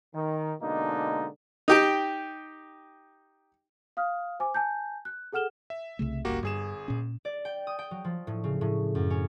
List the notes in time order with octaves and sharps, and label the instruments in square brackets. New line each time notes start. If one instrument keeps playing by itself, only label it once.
[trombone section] D#3
B2 D3 G#3 A#3 D4 D#4
[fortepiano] D#4 G4 G5
[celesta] F5 D#6 F6
C5 G#5 D6
G#5 A5 G6
F#6
G#4 A4 F#5 F6 E7 G7
[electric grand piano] E5
[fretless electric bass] C2 C#3 A3
[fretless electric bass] G1 C#2 [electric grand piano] A#3 F#4 G4
[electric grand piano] G1 G#4 E7 [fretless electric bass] G2
[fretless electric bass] A#2 C#4
[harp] D5
G5
D#6
G5
F#3
F3
A2
C#3
A2
F#2
C#4